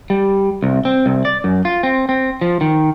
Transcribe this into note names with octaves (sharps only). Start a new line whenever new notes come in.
G3
C2
C4
C2
D5
F#2
F4
C4
C4
F3
D#3